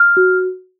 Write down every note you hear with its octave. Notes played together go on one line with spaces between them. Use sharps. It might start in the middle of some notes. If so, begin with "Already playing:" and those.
Already playing: F6
F#4